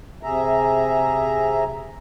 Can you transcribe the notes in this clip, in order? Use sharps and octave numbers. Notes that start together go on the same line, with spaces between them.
C3 G#4 E5 A#5